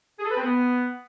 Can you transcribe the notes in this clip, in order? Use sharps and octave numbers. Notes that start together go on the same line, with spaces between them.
G#4
A4
B4
C4
B3